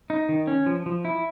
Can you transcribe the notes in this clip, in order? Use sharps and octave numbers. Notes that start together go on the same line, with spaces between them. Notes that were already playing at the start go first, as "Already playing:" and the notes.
D#4
D#3
C#4
F3
F3
E4